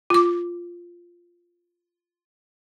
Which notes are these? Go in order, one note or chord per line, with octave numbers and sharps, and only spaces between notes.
F4 D6